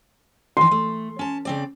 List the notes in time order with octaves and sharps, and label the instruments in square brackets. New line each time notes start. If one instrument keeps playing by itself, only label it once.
[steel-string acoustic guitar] D#3 E3 [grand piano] C6
[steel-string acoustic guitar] A3
C#4 A5
C#3 C4 D5